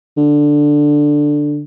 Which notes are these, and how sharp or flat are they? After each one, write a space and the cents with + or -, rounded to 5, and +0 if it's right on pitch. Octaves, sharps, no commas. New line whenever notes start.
D3 +5